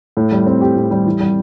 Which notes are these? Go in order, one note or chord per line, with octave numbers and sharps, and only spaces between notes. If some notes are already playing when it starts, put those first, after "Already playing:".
A2
G3
C4
G4
A2
G3
E3
G3